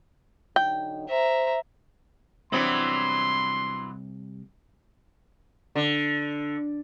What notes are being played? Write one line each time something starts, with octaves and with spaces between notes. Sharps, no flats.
D3 F#3 D#4 G5
C5 E5 A#5
C2 E3 F#3 B3 C4 D4 C6
D3